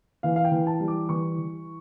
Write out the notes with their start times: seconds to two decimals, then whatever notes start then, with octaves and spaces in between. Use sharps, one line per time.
0.23 E3 F5
0.36 F5
0.44 G5
0.52 E3
0.67 A5
0.80 G3
0.88 D6
1.09 E3 C#6
1.38 E3